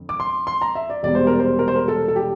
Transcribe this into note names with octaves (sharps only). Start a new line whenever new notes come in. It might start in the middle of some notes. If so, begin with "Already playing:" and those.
Already playing: F2 D3 C4
D6
C6
C6
A#5
E5
D5
E1 E2 C3 G3 D5
C5
A#4
C5
A#4
C5
A#4
A4
A4
G4